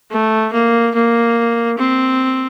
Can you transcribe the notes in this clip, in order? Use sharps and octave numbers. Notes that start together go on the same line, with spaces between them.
A3
A#3
A#3
C4